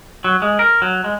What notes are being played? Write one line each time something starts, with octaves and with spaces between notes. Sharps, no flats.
F#3
G#3
A#4
F#3
G#3